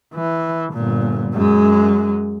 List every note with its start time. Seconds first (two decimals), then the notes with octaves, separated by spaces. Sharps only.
0.14 E3
0.72 G1 A#2
1.33 F#2 G#3